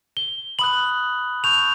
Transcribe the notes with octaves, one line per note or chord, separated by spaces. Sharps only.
G7
B5 D#6 F#6 F#7
A5 C#6 E6 G6 F7